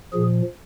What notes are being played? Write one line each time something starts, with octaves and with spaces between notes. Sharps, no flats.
A#2 F3 G#4